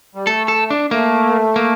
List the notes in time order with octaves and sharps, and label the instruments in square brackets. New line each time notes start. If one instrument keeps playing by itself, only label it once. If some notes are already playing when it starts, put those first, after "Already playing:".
[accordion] G3
[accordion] A3 [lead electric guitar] A4
[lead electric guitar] A4
D4
[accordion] A3 [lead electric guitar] A#3
[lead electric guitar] A#3